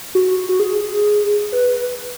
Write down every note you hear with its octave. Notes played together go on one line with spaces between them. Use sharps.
F#4
F#4
G#4
B4